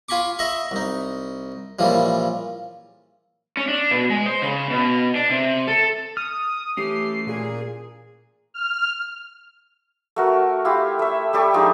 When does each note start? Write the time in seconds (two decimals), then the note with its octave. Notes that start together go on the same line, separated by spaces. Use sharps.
0.09 F4 G#5 B5 C#6 D6
0.39 D#5 E5 B5 C#6
0.71 C2 D#4
1.79 A#2 C#3 E3 F3 G3
3.57 C#4
3.68 D4
3.91 B2
4.10 G#3
4.26 C5
4.42 C#3
4.70 B2
5.15 D4
5.30 C3
5.68 A4
6.17 D#6 F6
6.77 E3 A3 C#4 G4 C7
7.27 A#2 G#4
8.54 F6
10.16 A3 F#4 A#4
10.65 E4 F4 G4
10.99 A3 E5
11.33 G3 G4 A4 C#6
11.54 F3 G#3 D4 D#4